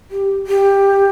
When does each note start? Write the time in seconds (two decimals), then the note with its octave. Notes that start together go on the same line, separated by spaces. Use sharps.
0.11 G4
0.47 G4